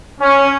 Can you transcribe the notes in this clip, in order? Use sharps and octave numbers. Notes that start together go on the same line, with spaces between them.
C#4